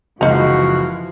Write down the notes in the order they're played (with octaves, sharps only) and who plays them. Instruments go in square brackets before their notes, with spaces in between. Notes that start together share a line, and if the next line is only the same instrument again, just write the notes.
[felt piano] F#1 C#2 [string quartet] E3 F3 [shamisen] D#4 A#5 [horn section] F#4